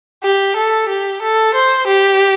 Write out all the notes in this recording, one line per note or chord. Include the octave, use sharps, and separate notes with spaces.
G4
A4
G4
A4
C5
G4